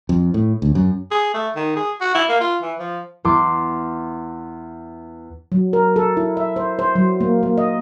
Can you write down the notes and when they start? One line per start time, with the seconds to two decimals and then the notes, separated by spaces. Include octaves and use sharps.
0.09 F2
0.34 A2
0.62 D2
0.75 F#2
1.11 G#4
1.34 A3
1.56 D#3
1.76 G#4
2.01 F#4
2.15 E4
2.29 A#3
2.41 F4
2.62 E3
2.79 F3
3.24 E2 C6 D6
5.52 F#3
5.73 A#4
5.96 A4
6.17 E4
6.37 E5
6.56 C5
6.79 C5
6.95 F#3
7.21 A#3
7.43 A#3
7.58 D#5